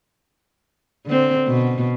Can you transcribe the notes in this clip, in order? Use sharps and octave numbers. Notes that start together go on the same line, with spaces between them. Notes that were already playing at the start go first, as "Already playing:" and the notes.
D3 C4
B2